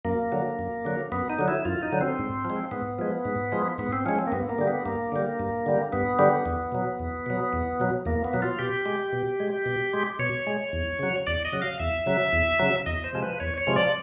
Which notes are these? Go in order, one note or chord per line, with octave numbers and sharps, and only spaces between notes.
F#2 A#3
D3 F#3
F#2
D3 F#3
F#2 B3
D#4
D3 F#3
E4
F#2 F4
D#4
D3 F#3
C4
G#2
F3
G#3
G#2 B3
F3 G#3
G#2
F3 G#3
G#2 B3
C4
F3 G#3 C#4
C4
A#3
G2 B3
A#3
D3 G3
B3
G2 A#3
D3 G3
G2
D3 G3
G2 B3
D3 G3
E2
B2 F#3
E2
B2 F#3
E2
B2 F#3
E2 A#3
B3
B2 F#3
F4
B2 G4
G#3
B2
G#3
B2
G#3
B2 C#5
G#3
E2
C#3 F#3
E2 D5
D#5
C#3 F#3
F5
E2 E5
C#3 F#3
E2
C#3 F#3
E2 D#5
C5
C3 F3 G#3
B4
E2 C#5
C#5
C3 F3 G#3
D5